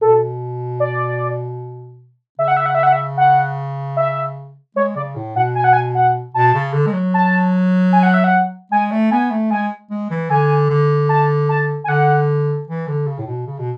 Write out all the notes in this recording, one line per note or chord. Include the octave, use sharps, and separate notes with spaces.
B2 A4
D5
C#3 E5
F#5
E5
F#5
E5
F#5
E5
F#5
E5
G#3 C#5
C#3 D5
A2
B2 F#5
G#5
F#5
G#5
F#5
B2 A5
C#3
D3
G#3
F#3
A5
G#5
F#5
E5
F#5
G#3 G#5
A3
B3 G#5
A3
G#3 G#5
G#3
E3
D3 G#5
D3
A5
A5
G#5
D3 F#5
E3
D3
C#3
A2
B2
C#3
B2